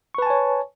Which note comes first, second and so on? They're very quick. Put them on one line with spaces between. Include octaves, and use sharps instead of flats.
C#6 B4 A5 G#5 C#5